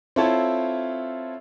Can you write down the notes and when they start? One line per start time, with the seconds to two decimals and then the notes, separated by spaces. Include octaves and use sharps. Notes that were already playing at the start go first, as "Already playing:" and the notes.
0.16 C4 E4 F4 A4 C#5